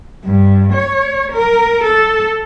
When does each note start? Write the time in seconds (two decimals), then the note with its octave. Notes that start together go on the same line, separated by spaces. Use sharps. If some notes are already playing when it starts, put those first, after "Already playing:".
0.24 G2
0.73 C#5
1.32 A#4
1.84 A4